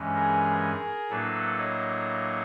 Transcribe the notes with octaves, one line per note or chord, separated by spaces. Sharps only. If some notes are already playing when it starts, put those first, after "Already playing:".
Already playing: G2 E3 G#3 C#4
G#4 A#4
A2 F#3 A#3 D4 A4 B4
C#5 D#5